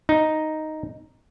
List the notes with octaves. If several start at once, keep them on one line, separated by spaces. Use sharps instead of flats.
D#4